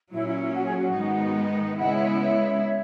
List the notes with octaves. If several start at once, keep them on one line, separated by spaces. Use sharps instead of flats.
A#2 F#3 C#4 E4
E4
E4
F#4
G#4
F#4
G#2 D#3 G#3 B3 D#4
C#3 G#3 B3 E4 D#5 F#5
C#5 E5
C#5 E5